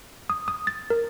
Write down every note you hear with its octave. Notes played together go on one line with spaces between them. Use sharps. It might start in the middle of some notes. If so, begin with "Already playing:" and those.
D#6
D#6
A6
A#4